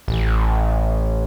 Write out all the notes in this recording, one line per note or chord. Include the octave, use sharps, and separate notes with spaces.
A1